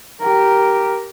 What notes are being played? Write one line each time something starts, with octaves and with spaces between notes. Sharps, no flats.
G4 A#4